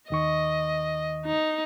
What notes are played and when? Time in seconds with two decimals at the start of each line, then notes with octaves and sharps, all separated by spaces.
0.10 D#2 D#3 D#5 C#6
1.26 D#4